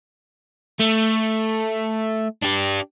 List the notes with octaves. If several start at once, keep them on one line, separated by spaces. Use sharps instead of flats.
A3
D4 G4